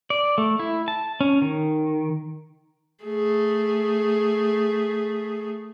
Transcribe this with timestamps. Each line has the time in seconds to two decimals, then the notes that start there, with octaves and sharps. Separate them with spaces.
0.10 D5
0.38 A3
0.60 E4
0.88 A5
1.21 C#4
1.42 D#3
3.04 A3 G#4